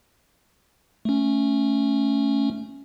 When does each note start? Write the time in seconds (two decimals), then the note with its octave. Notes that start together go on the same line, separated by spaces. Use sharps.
1.05 A3 C#4